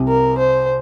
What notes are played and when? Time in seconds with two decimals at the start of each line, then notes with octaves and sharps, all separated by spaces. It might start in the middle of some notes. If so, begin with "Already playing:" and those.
Already playing: C2 C3
0.08 A#4
0.38 C5